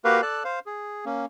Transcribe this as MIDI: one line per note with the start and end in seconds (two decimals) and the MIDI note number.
0.05 0.21 58
0.05 0.21 66
0.05 0.21 67
0.05 0.21 70
0.05 0.21 71
0.05 0.21 77
0.22 0.43 69
0.22 0.43 74
0.22 0.43 81
0.22 0.43 90
0.44 0.59 72
0.44 0.59 77
0.66 1.05 68
1.05 1.25 58
1.05 1.25 61